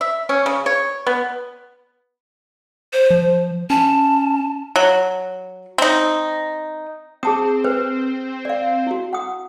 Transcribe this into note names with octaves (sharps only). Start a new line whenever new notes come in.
E5
C#4
C#3
C#5
B3
C5
F3
C#4 A5
F#3
C4 D#4
C4 G#4 A5 D#6
B4 C5
D5 F5
E4 F#4
F#5 D#6